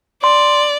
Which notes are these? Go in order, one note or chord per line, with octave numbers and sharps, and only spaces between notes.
D5 C6